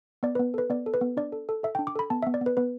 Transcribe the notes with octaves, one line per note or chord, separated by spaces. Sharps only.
B3 D5
B3 B4
A4 B4
B3 D5
A4
B4
B3
D4 D5
A4
A4
A4 E5
D4 G5
D6
A4 B5
B3 A5
B3 E5
D5
B3
B4
B3 B4